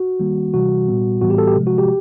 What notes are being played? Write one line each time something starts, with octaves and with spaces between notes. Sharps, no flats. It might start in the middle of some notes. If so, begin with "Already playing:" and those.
Already playing: F#4
D#3 G3 A#3
C3 E3 G3 F#4
A#2 G3 B3
A2 E3 G3 B3 F#4
G4
A4
G4
C3 F3 G#3
F#4
G4